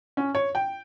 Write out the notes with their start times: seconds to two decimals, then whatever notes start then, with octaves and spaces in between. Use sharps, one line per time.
0.17 C#4
0.35 C#5
0.55 G5